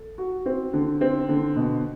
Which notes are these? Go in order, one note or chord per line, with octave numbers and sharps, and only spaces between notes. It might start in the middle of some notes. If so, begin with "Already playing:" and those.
Already playing: A4
F#4
C4
D3
C4
D3
B2